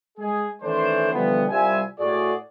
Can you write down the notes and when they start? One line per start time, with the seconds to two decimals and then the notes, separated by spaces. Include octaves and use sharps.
0.18 G#3 G#4
0.62 D#3 E3 A3 C#4 D4 C5
1.12 D3 E3 F3 G3 B3
1.49 C2 G3 F4 C5 E5 G#5
1.99 A2 F#4 G#4 D5